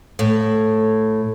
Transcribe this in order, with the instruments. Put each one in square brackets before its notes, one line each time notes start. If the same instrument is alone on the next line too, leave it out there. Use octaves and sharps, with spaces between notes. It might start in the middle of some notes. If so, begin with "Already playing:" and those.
[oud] A2